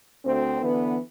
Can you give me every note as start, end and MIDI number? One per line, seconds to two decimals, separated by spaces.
0.24 0.60 38
0.24 0.60 60
0.62 0.98 50
0.62 0.98 52
0.62 0.98 59